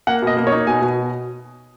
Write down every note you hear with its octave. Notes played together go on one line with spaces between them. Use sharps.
A#3 F#5
B2 D#5
A#3
C#5
D#4
B2 G#5
B2